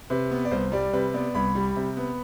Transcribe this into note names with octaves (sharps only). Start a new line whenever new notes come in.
C3 B4
B3
D5
C2 C5
G3 D5
C3 B4
B3 D5
C2 B5
G3
C3
B3